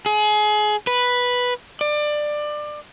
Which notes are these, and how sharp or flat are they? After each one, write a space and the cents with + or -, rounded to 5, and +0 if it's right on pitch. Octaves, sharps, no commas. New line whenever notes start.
G#4 +30
B4 -5
D5 +20